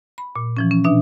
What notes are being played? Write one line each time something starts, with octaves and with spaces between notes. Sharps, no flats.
B5
A#2
E3 F3 C#4
C#4
B2 D4 E5